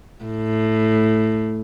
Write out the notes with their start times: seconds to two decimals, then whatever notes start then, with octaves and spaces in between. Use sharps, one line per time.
0.24 A2